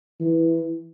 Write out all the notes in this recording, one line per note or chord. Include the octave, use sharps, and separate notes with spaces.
E3